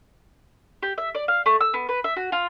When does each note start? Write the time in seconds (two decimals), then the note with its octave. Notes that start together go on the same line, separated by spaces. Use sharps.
0.83 G4
0.98 E5
1.15 D5
1.28 F5
1.46 A3
1.61 E6
1.74 B3
1.89 B4
2.04 E5
2.17 F#4
2.32 F4